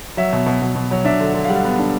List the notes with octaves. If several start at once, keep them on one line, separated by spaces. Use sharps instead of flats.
F#3 E5
B2
B2
B2
B2
F#3
D4 E5
D3
D3
F5
G3 F#5
B3
D4